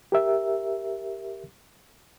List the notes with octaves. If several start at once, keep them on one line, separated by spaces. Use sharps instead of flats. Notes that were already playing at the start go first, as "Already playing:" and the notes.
G4 A#4 E5